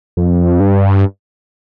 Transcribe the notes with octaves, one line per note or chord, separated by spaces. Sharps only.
F2
G2